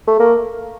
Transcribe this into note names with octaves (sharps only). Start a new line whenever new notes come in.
A3
A#3